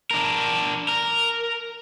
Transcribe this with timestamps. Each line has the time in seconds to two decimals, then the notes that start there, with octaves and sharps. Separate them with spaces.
0.11 D4 A#4
0.89 A#4